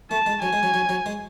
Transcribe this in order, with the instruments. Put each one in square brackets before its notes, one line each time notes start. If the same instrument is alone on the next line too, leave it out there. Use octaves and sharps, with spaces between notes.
[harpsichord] A3 [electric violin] A5
[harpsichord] G#3
[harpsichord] F#3 [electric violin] G#5
[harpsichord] G#3
F#3
F#3
F#3
G#3